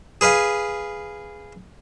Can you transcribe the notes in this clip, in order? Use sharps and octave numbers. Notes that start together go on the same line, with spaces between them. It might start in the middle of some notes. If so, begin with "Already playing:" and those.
G#4 B4 F5 G#5